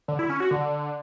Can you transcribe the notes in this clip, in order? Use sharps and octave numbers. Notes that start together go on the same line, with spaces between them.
D3
E4
C#4
F#4
D3